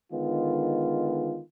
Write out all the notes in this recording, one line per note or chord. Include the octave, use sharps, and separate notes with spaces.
D3 D#3 G#3 B3 F4